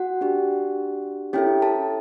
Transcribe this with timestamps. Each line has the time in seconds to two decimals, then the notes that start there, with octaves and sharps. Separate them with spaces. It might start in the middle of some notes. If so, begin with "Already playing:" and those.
Already playing: F#4 F#5
0.21 D4 G4
1.33 C#4 E4 G4 A4 G5
1.62 A4 A5